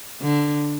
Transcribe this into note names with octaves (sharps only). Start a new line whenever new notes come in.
D3